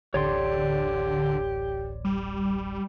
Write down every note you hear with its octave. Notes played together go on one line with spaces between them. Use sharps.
D1 A1 D3 G4 C#5 D5 C6
G3